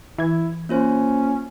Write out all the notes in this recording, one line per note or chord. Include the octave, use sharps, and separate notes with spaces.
E3 E4 G#6
A#3 C#4 F4 C5